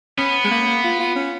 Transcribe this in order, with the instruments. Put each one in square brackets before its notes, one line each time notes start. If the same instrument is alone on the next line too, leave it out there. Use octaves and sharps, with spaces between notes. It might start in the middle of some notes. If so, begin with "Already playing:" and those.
[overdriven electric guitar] B3 [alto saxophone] C#4
[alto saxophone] G#3
A#3
A#3
F4
F4
C#4